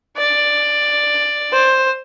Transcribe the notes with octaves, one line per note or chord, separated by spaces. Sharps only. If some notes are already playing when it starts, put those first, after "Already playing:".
D5
C5